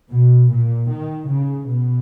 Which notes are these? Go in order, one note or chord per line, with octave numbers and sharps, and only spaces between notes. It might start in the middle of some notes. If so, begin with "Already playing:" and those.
B2
A#2
D#3
C#3
B2